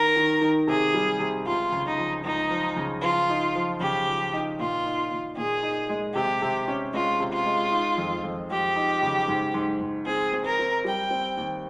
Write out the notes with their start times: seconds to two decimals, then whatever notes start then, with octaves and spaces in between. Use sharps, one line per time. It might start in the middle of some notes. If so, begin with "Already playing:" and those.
Already playing: D#3 A#4
0.16 D#3
0.41 D#3
0.67 C3 G#4
0.94 G3
1.20 C3
1.46 C#2 F4
1.72 C#3
1.86 D#4
1.98 F3
2.25 C#2 D#4
2.50 F3
2.76 C#3
3.02 F3 F4
3.29 D#4
3.55 F3
3.80 C#3 G4
4.07 F3
4.33 D#4
4.59 A#2 F4
4.85 D#4
5.11 A#2
5.37 A#2 G#4
5.63 D#4
5.89 G#3
6.15 C3 G4
6.42 C3
6.68 C#4
6.93 G#3 F4
7.20 C3
7.33 F4
7.46 G#3
7.72 D#4
7.98 F2
8.24 F2
8.50 F2 G4
8.76 D#4
9.03 C#3
9.28 G#2
9.54 G#2
9.81 G#2
10.06 C4 G#4
10.33 C4
10.45 A#4
10.59 C4
10.85 G3 G5
11.10 C4
11.37 D#2